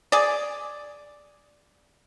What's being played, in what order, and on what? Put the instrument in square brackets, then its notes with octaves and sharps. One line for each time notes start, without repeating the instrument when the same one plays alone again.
[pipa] G#4 D5